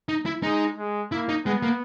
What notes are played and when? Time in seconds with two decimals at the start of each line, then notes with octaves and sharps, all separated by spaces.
0.09 D#4
0.26 E4
0.43 G#3 D#4
0.78 G#3
1.12 A#3 E4
1.29 D#4
1.46 G#3 B3
1.63 A#3